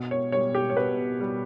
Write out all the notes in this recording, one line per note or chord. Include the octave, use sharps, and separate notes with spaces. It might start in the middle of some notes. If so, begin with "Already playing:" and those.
Already playing: B2
C#5
G3 C#5
G4
C#5
B2 B4
G3